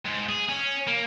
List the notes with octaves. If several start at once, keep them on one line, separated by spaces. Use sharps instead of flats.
G#2
G#4
C#4
A#3